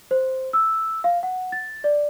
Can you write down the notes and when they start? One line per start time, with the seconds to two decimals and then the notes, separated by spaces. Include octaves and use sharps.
0.11 C5
0.53 E6
1.04 F5
1.23 F#5
1.52 A6
1.84 D5